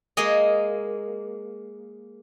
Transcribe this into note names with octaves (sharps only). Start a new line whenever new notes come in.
G#3 A#3 G#4 D#5